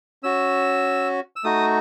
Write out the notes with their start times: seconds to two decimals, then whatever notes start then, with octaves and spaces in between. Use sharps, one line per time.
0.23 C#4 F#4 E6
1.36 E6
1.44 A3 D#4 F#4 D#6